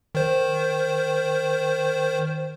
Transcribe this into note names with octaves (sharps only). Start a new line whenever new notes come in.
D#3 C5